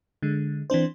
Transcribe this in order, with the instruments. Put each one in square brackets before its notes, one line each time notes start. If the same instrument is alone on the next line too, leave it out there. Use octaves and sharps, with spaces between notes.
[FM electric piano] D3 G#3
E3 C4 D4 C5